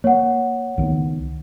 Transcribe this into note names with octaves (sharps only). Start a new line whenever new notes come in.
A#3 C#5 F#5
C#2 D#3 B3